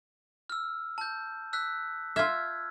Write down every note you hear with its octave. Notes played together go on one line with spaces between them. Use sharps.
E6 F6
A5 G6
E6 F#6 B6
F4 E5 E6 F6 G#6